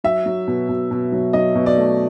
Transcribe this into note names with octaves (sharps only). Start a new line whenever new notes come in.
F#3 E5
F#3
B2
B2
B2
F#3
F#3 D#5
B2
D5
A3